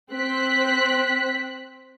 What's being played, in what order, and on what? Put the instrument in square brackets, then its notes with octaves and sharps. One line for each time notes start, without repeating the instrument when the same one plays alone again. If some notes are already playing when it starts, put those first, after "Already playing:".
[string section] C4 C5 F#6 B6